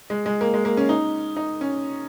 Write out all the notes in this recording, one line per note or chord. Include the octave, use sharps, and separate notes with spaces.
G#3
G#3
A#3
G#3
A#3
C#4
D#4
D#4
C#4